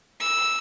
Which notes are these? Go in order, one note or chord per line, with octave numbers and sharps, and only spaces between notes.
E6